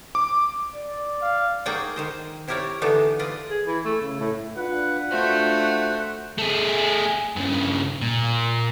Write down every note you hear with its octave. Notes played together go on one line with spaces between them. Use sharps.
D6
D5
F5
A#3 D#4 F#4 G#4 D5 G5
D#3 C5 D#5
C4 E4 G4 A#4 C#5 D5
D3 E3 A3 B3 D4 D#4
F4 B4 D5 D#5
G#4
E3
A3
C#3
A2
D4 F4 B4 F#5
A3 F#4 C5
A3 G#4
G2 C#3
A#2